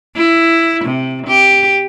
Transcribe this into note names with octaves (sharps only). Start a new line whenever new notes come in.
E4
C3
G4